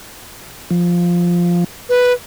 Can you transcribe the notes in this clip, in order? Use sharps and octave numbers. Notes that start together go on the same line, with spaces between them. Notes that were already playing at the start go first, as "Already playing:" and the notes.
F3
B4